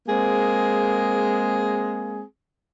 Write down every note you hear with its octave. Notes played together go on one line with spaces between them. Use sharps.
G#3 A#3 C4 G#4